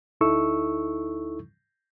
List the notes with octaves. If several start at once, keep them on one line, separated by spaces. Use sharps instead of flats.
D2 D#4 E4 A4 C#6 E6